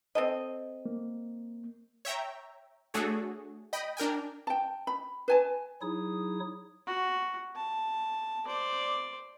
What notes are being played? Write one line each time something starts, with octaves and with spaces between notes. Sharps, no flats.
C4 A4 D#5
A#3
C#5 E5 G5 A#5
A3 D4 F#4 G#4 A4 C#5
D#5 G5 B5
D4 A#4 G5 G#5
G5 A5
B5
B4 G#5 A5
F#3 D#4 E4 G#4 C#5 D#6
F#4
A5
C5 D5